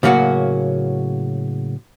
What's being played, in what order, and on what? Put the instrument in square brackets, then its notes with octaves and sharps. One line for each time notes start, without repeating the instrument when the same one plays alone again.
[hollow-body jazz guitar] A2 C#3 F#3 A#3 C#4 F#4